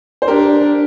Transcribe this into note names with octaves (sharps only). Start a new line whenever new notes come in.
C5
D4 G4 A#4